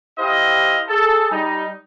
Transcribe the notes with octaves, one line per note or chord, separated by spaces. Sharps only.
E4 G4 C5 D#5 F5
G#4 A4
G3 D#4